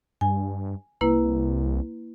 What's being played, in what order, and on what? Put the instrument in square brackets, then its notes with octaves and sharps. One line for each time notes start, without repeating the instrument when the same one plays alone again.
[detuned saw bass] G2 [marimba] G#5
[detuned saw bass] C2 [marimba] A#3 E4 B4